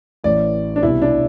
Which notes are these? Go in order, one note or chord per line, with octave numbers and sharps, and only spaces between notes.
A1 A2 E3 D5
D4
C2 B2 E4
D4